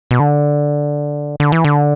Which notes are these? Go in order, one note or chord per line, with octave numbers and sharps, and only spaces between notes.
B2
D3
D3
E3
D3